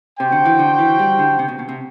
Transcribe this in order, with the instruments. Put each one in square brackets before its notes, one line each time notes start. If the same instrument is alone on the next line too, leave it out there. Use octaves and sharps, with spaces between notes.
[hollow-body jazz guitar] C3 [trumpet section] F#4 C5 G5
[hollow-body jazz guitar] D3
E3
D3
E3
G3
D3
C3
B2
B2
C3